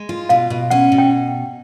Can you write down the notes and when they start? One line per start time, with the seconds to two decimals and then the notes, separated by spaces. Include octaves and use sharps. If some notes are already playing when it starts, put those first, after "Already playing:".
Already playing: G#3
0.09 F4
0.29 B2 F5
0.50 B2
0.70 C#4 F#5
0.92 B2
0.98 G5